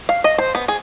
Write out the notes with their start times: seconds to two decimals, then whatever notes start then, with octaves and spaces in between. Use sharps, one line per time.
0.09 F5
0.24 D#5
0.38 C5
0.55 B3
0.68 G#4